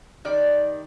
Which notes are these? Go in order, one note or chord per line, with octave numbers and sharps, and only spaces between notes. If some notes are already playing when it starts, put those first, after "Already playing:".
D#3 G3 D5